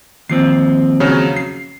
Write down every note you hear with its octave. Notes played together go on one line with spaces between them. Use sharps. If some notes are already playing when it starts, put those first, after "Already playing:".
D#2 F3 C4 C7
C#3 F#3 C#4
C7